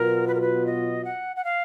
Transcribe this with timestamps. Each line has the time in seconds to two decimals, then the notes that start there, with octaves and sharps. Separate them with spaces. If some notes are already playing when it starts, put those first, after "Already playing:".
Already playing: B2 F#3 B3 F4 A#4
0.28 B4
0.34 A#4
0.41 B4
0.67 D#5
1.05 F#5
1.36 F#5
1.44 F5